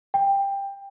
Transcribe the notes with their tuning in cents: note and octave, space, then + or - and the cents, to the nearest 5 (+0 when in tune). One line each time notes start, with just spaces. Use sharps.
G5 +15